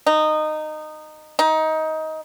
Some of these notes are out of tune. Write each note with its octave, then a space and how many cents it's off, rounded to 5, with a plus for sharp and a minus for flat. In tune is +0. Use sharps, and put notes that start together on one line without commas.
D#4 -15
D#4 +20